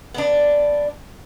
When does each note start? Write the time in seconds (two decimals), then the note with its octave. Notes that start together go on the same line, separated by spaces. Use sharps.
0.14 B3 D4